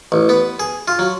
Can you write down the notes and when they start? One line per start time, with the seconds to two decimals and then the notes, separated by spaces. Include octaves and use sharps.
0.12 A1
0.29 B3
0.60 G#4
0.88 F4
0.99 F#3